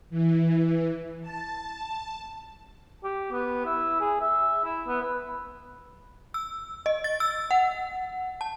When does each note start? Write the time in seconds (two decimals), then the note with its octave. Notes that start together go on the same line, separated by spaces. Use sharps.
0.10 E3
1.21 A5
3.04 G4
3.32 B3
3.66 E4
4.00 G#4
4.20 E5
4.64 E4
4.88 B3
5.02 B4
6.34 E6
6.86 D#5
7.04 A6
7.20 E6
7.51 F#5
8.41 A5